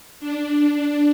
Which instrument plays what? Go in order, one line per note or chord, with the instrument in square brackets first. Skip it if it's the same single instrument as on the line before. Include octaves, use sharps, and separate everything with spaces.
[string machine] D4